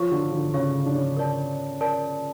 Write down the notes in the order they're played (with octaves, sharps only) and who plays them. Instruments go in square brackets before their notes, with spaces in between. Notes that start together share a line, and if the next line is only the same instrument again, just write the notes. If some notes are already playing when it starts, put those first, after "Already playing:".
Already playing: [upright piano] F3 [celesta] C#5 F5 C#6
[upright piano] D3
D3
[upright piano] C#3 [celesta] C#5 F5 C#6
[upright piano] D4
C#4
[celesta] A#4 D5 A5
A#4 D5 A5